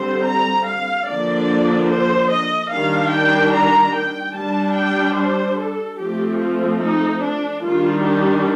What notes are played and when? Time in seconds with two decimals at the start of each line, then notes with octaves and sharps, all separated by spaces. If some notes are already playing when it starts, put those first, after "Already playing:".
Already playing: D3 G3 C4 C5
0.27 A#5
0.68 F5
1.08 D3 F3 A#3 D4 D5
1.91 C5
2.31 D#5
2.72 D#3 G3 D4 F5
3.13 G5
3.54 A#5
3.94 G5
4.35 G3 D4 A5
4.76 G5
5.17 C5
5.58 A4
5.98 F3 A3 C4 G4
6.40 F4
6.80 D#4
7.21 D4
7.62 D#3 G3 D4 F4
8.03 G4